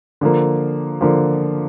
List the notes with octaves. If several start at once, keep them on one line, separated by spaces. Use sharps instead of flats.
D3 F3 A#3
D3 F3 A#3